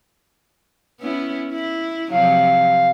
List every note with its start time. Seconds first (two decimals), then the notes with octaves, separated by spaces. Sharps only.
1.00 B3 C#4 E4
1.52 E4
2.12 C3 F3 F#3 F5